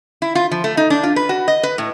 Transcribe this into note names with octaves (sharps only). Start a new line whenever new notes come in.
E4
F4
F3
A3
D#4
D4
F4
B4
F#4
D#5
B4
A2